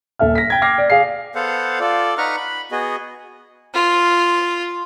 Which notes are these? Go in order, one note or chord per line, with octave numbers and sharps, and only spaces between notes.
D#1 A4 E5 F6
A#6 B6
G5 G#6
G5 D6 F6 A#6 C7
D5
G#4 F5 C7
B3 A4 C5 F5 F#5
F4 A4 D5
D#4 B4 F#5 A#5 C#6 F6
B5
B3 F#4 G#4 D#5
F4